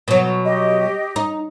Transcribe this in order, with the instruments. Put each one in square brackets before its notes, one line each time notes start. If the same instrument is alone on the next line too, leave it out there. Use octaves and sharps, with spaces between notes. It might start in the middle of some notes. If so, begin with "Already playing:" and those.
[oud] B2 F#3
[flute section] G4 D#5
[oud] D#4